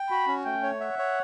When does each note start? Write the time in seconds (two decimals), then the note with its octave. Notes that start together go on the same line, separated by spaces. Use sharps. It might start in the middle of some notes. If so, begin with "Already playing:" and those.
Already playing: G5
0.10 F#4 B5
0.27 C#4
0.45 A3 G5
0.63 C#5
0.81 E5 F#5
0.99 C#5